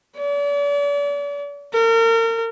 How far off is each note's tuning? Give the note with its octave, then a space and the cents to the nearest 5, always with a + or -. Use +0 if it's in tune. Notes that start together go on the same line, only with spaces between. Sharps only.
D5 -40
A#4 -35